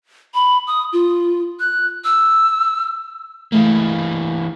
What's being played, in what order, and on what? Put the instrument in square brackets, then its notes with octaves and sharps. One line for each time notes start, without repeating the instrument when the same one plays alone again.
[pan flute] B5
D#6
F4
F#6
E6
[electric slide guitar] E3 A#3 [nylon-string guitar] A3 G#4 F5